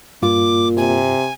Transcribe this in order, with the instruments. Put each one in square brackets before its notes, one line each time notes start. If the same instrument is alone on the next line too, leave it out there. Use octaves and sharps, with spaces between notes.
[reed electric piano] G2 F4 [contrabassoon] A#2 [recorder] D6
[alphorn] C3 [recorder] G#5